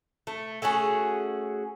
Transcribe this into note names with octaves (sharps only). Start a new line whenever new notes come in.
A3
A3 C#4 F#4 G#4